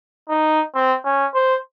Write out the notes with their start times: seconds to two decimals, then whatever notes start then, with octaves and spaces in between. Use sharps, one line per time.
0.30 D#4
0.75 C4
1.05 C#4
1.35 C5